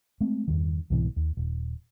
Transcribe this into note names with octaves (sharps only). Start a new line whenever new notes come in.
G#3 A3 C4
E2 G2 D#3
C2 G#2 B2 E3
D#2
D#1